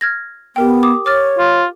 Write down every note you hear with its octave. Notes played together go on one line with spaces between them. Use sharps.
F6 G#6 A#6
B3 G4 A#4 G5
D6 D#6
C#5 D6 F6 A6
F4